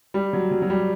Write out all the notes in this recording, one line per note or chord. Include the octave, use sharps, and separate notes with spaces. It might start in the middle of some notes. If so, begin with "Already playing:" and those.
G3
F#3
F#3
F#3
G3